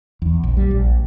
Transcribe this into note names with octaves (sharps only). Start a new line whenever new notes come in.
E2
A#1
G3
A#1